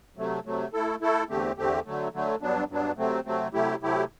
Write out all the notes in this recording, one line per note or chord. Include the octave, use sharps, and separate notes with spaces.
C3 F#3 A3
C3 F#3 A3
A3 E4 A4
A3 E4 A4
E2 D3 A3 C4 G4
E2 D3 A3 C4 G4
D3 F#3 A3
D3 F#3 A3
G2 F#3 B3 D4
G2 F#3 B3 D4
C3 F#3 A3 C4
C3 F#3 A3 C4
C3 F#3 A3 E4 G4
C3 F#3 A3 E4 G4